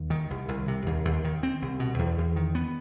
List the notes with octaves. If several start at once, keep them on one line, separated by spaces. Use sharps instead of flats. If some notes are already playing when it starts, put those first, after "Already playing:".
Already playing: D#2
D#3
C2
C2
C3
D#2
D#2
D#3
C4
C2
B2
E2
E2
D#3
B3